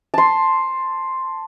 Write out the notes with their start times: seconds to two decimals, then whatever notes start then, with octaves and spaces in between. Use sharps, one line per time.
0.14 A5 C6